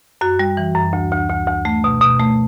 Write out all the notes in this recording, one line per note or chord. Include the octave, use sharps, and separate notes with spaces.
F#2 F#4
G3
E3
F#2
D2
D2
D2
D2
A3
B2
B2
A3